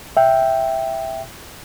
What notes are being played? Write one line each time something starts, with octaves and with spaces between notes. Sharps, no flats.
E5 G5